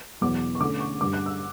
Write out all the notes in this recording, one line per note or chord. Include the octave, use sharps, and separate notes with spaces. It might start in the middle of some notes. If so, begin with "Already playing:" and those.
E2 B2 F#3 B3 D6
C#6
D3 A3 C#4 D6
C#6
G2 D3 G3 D6
F#6
E6